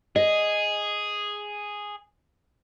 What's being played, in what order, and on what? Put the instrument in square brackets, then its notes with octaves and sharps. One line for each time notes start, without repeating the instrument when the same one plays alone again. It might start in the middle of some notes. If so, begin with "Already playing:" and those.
[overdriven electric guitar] G#4 [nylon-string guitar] D#5